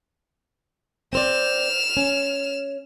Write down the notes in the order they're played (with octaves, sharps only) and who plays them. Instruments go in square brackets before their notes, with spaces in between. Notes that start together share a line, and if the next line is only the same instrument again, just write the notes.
[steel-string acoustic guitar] C4 C5 D5 [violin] F6 E7
[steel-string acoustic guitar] C#4